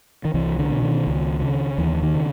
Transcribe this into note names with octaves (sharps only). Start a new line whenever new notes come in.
D#3
C2 E3
D3
B2
D#3
C#2
C#3
D#2 E3
D#3
C#3